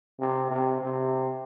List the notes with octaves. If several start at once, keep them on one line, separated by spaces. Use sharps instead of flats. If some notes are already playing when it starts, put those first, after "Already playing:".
C3
C3
C3